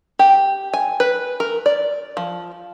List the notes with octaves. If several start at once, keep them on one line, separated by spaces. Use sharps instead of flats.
G4
G#5
B4
A#4
D5
F3